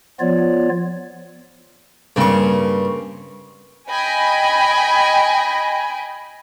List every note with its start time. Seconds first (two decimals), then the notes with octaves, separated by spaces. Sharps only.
0.20 F3 B3 F4 C#5 D5
2.16 G2 C#3 A#3 C4 C#6
3.89 D#5 G5 G#5 B5